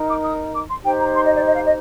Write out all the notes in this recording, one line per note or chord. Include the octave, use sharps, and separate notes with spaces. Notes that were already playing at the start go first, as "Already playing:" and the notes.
Already playing: D#4 A#4
D6
D#6
D6
C6
D#4 G4 C5 G5
A#5
C6
D#5
D5
D#5
F5
D#5